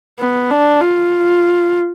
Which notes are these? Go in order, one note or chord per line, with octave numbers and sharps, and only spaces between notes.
B3
D4
F4